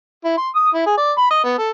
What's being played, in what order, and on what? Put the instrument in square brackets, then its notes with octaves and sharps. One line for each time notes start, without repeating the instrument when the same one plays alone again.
[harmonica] E4
C6
D#6
E4
G#4
D5
B5
D#5
B3
A4